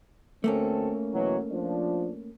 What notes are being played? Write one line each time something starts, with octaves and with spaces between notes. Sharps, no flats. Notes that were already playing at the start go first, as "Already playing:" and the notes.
D2 A3 A#3 C4 C#4 A4
B2 E3 F#3
F3 D4